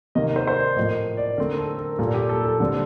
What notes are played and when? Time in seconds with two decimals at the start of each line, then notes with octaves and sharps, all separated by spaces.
0.15 C3 D#3 A#3 D#5
0.36 C5
0.47 C5
0.56 D5
0.76 A2 F3 A#3 D#5
1.17 D5
1.38 D3 A3 C4 A#4
1.58 A4
1.78 A#4
1.99 A#2 G3 A#3 A4
2.14 G4
2.29 A4
2.45 A4
2.60 D3 G3 C4